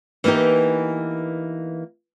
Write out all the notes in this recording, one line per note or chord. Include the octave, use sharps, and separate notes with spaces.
E3 A#3 B3 D#4 G4